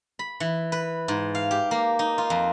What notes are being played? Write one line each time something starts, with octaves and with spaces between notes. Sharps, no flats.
B5
E3
B4
G#2
F5
G4
A#3
D#4
F4
F2